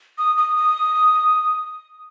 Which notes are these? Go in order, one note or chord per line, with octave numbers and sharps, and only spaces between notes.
D#6
D#6
D#6